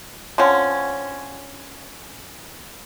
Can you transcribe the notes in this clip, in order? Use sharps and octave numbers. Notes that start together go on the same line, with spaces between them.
D3 F3 C4 C#4